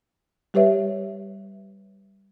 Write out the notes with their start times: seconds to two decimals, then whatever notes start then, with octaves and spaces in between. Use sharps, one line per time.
0.54 G3 G4 B4 C#5 E5